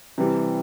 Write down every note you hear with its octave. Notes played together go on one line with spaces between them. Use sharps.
C3 E3 G3